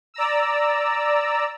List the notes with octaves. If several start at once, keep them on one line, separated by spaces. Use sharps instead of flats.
D5 A#5 E6